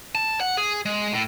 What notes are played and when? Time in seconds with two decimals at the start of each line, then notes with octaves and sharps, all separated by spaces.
0.15 A5
0.40 F#5
0.57 G#4
0.85 G#3
1.13 A2